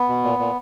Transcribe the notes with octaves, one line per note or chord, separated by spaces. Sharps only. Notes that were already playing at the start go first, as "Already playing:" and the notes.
Already playing: B3
B2
A#2
A#2